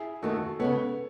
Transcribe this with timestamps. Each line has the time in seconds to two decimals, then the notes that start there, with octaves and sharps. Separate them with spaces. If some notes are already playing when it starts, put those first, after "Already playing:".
Already playing: E4 G#4
0.22 D#2 D#3 A3 F#4 A4
0.35 F#4 A4
0.59 C#3 G#3 B3 A4 C#5